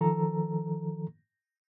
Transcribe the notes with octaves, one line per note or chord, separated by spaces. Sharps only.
D#3 F3 A4 A#5